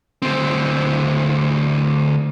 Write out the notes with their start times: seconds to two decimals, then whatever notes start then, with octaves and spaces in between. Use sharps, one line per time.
0.22 D2 C4